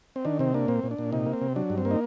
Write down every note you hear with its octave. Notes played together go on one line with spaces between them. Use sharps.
C4
D#3 D4
C3 C4
A#3 D4
A#2 C4
A#2
D4
A#2
C3 D#4
A#3
C4
C3
F#3 D4
G2
C4
A#3
D#4